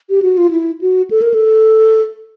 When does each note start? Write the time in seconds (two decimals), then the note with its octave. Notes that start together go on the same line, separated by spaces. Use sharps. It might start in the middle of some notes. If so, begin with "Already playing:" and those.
0.10 G4
0.22 F#4
0.38 F4
0.51 E4
0.81 F#4
1.11 A4
1.22 A#4
1.34 A4